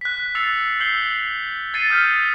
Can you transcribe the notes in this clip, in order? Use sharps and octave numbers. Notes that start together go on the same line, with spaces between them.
F#6 B6
E6 A6 C7 C#7 F7
E6 G6 C7 F#7 G7
G#6 A6 C7 C#7 D#7
D#6 F6 G6 B6